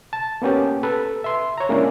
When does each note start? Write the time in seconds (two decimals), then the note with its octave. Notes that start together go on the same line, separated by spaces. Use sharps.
0.13 A5
0.42 A#3 B3 C#4 G4
0.83 A4 B4
1.24 E5 C6
1.58 C#5 A#5
1.69 G#3 A#3 C#4 D4 E4 D5